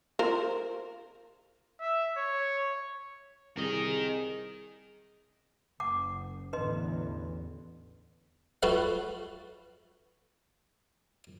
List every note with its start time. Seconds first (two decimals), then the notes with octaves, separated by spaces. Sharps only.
0.19 F4 A#4 C5
1.80 E5
2.17 C#5
3.57 C2 G#4 A#4 D#5
5.80 F#1 F#5 D6
6.53 A1 E2 D3 B4 D#5 C6
8.63 F4 F#4 A4 B4 E5 F5